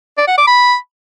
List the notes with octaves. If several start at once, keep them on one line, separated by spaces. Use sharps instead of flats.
D5
F#5
D6
B5